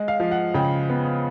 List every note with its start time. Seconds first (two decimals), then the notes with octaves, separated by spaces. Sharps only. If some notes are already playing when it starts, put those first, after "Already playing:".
Already playing: G#3
0.08 F5
0.20 F3
0.31 F#5
0.54 C#3 G5
0.89 B3